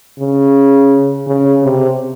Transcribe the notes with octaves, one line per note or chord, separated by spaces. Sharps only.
C#3
C#3
C3